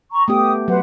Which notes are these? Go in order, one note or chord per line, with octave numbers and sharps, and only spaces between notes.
A#5 C#6
A3 B3 G4 G5 D#6
F#3 B4 C5 F#5